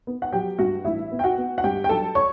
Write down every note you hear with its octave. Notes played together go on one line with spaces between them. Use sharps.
B3
F#5
F#3 G4 G5
G2 F#4 F#5
A1 E4 E5
B3
G5
F#4 F#5
B3
F#5
G2 G4 G5
G5
F#3 A4 A5
C#5 C#6